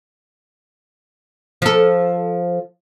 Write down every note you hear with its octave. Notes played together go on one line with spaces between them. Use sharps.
F3 A4